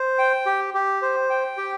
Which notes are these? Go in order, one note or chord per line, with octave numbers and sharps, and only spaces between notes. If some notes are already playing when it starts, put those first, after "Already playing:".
Already playing: C5
G5
G4
G4
C5
G5
G4